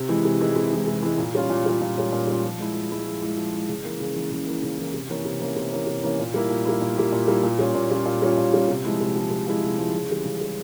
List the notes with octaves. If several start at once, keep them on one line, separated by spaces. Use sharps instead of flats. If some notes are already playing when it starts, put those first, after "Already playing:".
Already playing: C3
E3 G#3 E4
C3
E3 G#3 E4
C3
E3 G#3 E4
C3
E3 G#3 E4
A#2
G3 C#4 F4
A#2
G3 C#4 F4
A#2
G3 C#4 F4
A#2
G3 C#4 F4
F3
G#3 E4
F3
G#3 E4
F3
G#3 E4
F3
G#3 E4
C#3
E3 A#3
C#3
E3 A#3
C#3
E3 A#3
C#3
E3 A#3
C3
E3 A#3 C#4
C3
E3 A#3 C#4
C3
E3 A#3 C#4
C3
E3 A#3 C#4
A#2
G3 A#3 E4
A#2
G3 A#3 E4
A#2
G3 A#3 E4
A#2
G3 A#3 E4
A#2
G3 C#4 F4
A#2
G3 C#4 F4
A#2
G3 C#4 F4
A#2
G3 C#4 F4
C3
F3 G#3 E4
C3
F3 G#3 E4
C3
F3 G#3 E4
C3
F3 G#3 E4
C#3
E3 G3
C#3
E3 G3